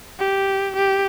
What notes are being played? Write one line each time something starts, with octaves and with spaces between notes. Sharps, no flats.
G4
G4